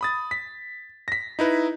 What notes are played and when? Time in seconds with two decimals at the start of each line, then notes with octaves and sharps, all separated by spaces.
0.01 B5 D#6 A6
0.31 B6
1.08 A#6 B6
1.39 D#4 E4 B4